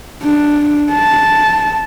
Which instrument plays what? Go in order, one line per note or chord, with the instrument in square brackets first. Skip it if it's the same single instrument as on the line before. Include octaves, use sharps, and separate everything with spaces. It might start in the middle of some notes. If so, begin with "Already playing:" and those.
[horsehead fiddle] D4
A5